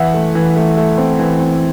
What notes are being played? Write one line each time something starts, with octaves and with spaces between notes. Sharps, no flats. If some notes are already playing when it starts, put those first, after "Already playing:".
Already playing: E3 E5 F#5
A3
E3
A3
A3
C4
E3
C4